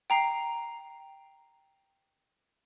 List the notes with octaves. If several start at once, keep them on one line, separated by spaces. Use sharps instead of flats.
G5 A#5 C7